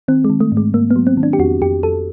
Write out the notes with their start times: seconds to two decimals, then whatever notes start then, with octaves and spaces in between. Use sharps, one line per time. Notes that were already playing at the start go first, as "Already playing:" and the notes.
0.08 D#3 C4
0.24 G#3
0.30 D#3
0.40 A3
0.52 G#2
0.57 G#3
0.74 G#2 A#3
0.91 B3
0.96 F#3
1.07 C4
1.17 D#3
1.23 D4
1.33 G4
1.39 F2 F#4
1.61 F2 G4
1.83 F2 A4